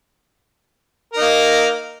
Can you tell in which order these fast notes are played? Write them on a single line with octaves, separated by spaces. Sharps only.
A#4 D#4 A#3